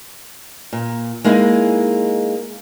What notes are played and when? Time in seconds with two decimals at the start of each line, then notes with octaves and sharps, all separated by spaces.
0.73 A#2
1.24 G#3 A#3 D#4 E4 G#4